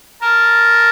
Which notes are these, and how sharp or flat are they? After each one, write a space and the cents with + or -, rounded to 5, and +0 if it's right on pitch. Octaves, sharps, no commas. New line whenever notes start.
A#4 +0 A5 +0